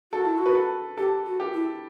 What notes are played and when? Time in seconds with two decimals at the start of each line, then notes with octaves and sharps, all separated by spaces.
0.12 F#4 A4
0.26 E4
0.38 F#4
0.46 B4
0.55 A4
0.97 G4 A4
1.26 F#4
1.40 G4
1.54 E4